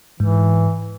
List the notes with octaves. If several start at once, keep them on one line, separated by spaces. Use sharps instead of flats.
G#2 E3